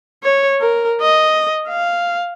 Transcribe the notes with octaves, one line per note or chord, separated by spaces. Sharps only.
C#5
A#4
D#5
F5